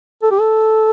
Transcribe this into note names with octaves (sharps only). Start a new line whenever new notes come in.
A4
G4
A4